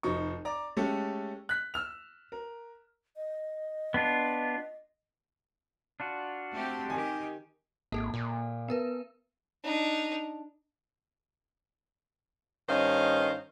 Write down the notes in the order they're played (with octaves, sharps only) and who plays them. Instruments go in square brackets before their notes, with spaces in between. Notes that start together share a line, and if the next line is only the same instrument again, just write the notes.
[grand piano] F1 F3 D#4 C#6
D5 A#5 D6
G#3 A3 C#4 G4 A4
F#6 B6
E6 F6 F7
A#4
[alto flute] D#5
[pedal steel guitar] B3 D4 F4
D4 F4 F#4
[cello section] A3 C4 G4
[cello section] D#3 G4 [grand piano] G#5
[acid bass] G#1 [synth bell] A#3 A4
[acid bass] A#2
[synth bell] B3 A#4 B4
[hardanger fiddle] D4 D#4
[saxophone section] G2 D#3 C#4 C5 D#5 F5